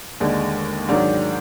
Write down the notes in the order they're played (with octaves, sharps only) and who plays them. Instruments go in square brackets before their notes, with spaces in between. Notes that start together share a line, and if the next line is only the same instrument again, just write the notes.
[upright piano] D#2 D3 G#3
G#2 D#3 F#3 D4